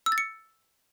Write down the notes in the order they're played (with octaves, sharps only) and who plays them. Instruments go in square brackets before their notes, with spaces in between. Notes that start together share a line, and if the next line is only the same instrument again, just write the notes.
[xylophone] E6
A6
C#7